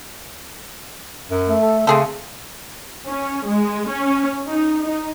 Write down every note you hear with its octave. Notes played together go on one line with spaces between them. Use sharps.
F#2
A3
A4
C#3 A3 C4 G#4 A4
C#4
G#3
C#4
D#4
D#4